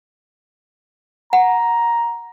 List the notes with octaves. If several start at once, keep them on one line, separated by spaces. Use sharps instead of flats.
F#5 A#5